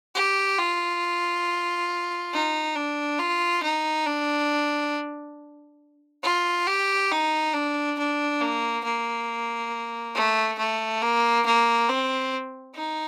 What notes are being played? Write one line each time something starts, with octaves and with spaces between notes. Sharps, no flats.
G4
F4
D#4
D4
F4
D#4
D4
F4
G4
D#4
D4
D4
A#3
A#3
A3
A3
A#3
A#3
C4
D#4